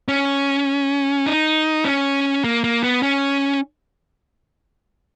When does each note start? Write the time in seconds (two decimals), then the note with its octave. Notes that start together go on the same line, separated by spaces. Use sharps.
0.08 C#4
1.26 D#4
1.85 C#4
2.44 A#3
2.64 A#3
2.83 B3
3.03 C#4